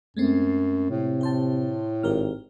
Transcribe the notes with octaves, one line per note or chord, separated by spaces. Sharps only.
F#2 G#3 A3 C4
A2 C3
G4 C5 A5
G#1 G4 A#4 F6